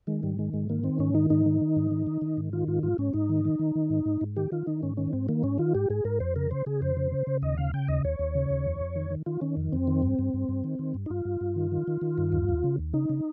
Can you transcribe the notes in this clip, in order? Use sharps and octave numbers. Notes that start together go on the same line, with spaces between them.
D#3 G#3
G#2 G3
D#3 G#3
G#2 G#3
D#3 A#3
D#3 C4
G#2 C#4
D#3 D#4
G#2 D#4
D#3
D#3
G#2
D#3
D#3
D#3
G#2
D#3 F4
G#2 F4
G#2 F4
G#2 C#4
G#2 D#4
D#3
D#3
D#3
D#3
G#2
G#2
G#2
D#3 G4
D#3 F4
D#3 D#4
G#2 C#4
D#3 C#4
G#2 C4
D#3 A#3
G#2 C#4
D#3 F4
G#2 G4
G#2 G#4
G#2 A#4
F2 C5
C#3 A#4
C#3 C5
C#3 G#4
F2 C5
C#3
C#3
C#3
D#2 D#5
C#3 F5
C#3 G5
D#2 D#5
D#2 C#5
D#2
C#3
D#2
F2
F2
D#3
D#3
D#3 F4
D#3 C#4
F2
F2 C4
D#3
G2
G2
G2
G2
D#3
D#3
G2
D#4
G2 F4
G2
G2
D#3
D#3
D#3
D#3
G2
D#2
D#2
C#3
D#2
C#3 D#4
C#3